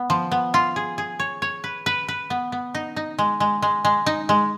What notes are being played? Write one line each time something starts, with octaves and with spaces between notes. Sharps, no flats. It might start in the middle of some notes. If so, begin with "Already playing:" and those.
Already playing: B3
F3
B3
F4
G#4
G#4
C#5
C#5
B4
B4
B4
B3
B3
D#4
D#4
G#3
G#3
G#3
G#3
D#4
G#3